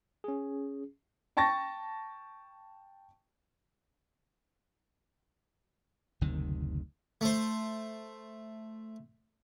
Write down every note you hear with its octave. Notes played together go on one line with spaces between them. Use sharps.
C#4 G#4
G5 A5 C#6 A6 A#6
F#1 D2 C3 D#3
A3 C5